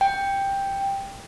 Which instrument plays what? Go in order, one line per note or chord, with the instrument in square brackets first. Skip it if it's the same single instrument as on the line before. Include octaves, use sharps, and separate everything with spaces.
[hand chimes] G5